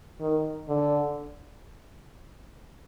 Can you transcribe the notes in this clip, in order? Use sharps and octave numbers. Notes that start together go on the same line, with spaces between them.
D#3
D3